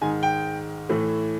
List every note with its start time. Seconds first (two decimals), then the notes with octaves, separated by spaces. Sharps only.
0.01 G#2 D#3 G#3 G#5
0.23 G5
0.89 A2 E3 A3